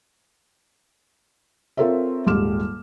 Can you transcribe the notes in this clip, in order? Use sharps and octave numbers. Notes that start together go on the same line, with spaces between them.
C4 F4 A4 A#4 C#5 E5
D#1 G#2 G3 D6 F6 E7